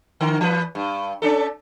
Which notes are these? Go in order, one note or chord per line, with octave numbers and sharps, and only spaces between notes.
D3 A#4
E3 B4
G2
C#4 D4 A4